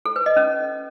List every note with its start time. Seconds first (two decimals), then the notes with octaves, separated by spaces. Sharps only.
0.06 A4
0.16 B4
0.26 D#5
0.36 C#4